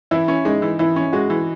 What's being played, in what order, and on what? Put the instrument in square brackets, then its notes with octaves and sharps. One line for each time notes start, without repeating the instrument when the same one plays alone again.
[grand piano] E3 [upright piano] E4
[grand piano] C#4
[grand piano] G#3 [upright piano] D#4
[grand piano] E3
[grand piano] E3 [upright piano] E4
[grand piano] C#4
[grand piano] G#3 [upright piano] F#4
[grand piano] E3